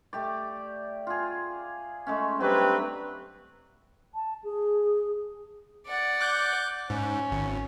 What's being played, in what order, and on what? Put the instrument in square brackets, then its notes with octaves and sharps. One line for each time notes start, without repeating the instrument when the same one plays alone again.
[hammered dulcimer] A3 G4 D5
F4 G#4
G#3 A3 C#4
[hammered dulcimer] F#3 G3 D4 [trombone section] C4 G4 B4
[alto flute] A5
G#4
[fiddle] D5 F#5
[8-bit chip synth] D6 F#6 G6
[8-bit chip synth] G#2 [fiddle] C#4
[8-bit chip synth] G#1